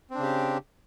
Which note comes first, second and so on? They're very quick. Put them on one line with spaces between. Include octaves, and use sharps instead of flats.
C4 D4 C#3 G4